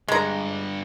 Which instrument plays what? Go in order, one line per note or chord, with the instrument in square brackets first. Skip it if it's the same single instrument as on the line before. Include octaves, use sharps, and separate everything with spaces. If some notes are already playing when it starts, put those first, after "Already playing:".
[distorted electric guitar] G2 D3 [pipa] G#3 A#5